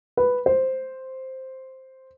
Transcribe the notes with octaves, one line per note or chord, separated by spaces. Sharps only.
B4
C5